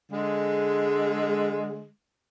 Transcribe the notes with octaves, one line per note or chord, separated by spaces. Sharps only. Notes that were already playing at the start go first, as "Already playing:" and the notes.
D3 G#3